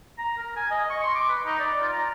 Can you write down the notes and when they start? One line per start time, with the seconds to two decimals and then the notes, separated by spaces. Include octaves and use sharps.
0.18 A#5
0.37 A#4
0.56 G#5
0.71 D#5
0.90 C#6
1.03 C6
1.15 D6
1.29 B4
1.45 D#4
1.59 D5
1.80 F4
1.92 A#5